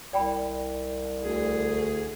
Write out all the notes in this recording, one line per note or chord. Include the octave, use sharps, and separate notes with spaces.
C2 D5 G5 B5
D2 G#4